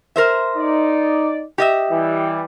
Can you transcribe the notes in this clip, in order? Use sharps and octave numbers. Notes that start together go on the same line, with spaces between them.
A#4 C5 E5
D#4 D5
G4 D#5 E5
E3 G3